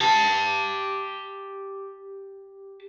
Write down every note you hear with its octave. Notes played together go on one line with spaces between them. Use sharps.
G4 A5